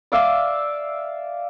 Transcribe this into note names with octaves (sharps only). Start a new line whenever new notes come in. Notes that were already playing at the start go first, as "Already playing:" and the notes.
D5 E5 F5 D6